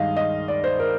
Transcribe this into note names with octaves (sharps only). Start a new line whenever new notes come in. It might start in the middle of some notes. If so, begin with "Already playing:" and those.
Already playing: G2 D#3 G#3 D#5 F5
D#5
D5
C5
A#4